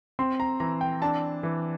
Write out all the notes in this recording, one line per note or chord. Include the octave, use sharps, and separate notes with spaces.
C4 C6
A#5
E3 A#5
G5
D4 A5
E3